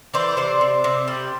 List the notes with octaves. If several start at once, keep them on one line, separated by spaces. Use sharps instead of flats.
E3 C5 D5
C3 C5 D5
C3
C3
G3